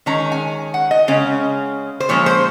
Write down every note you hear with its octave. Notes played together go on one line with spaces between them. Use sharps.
D#3 G#3 C#4 A#5
G#5
F#5
D#5
C#3 G#3 C#4
C5
A#2 F3 G#3 C#4 C#5
C5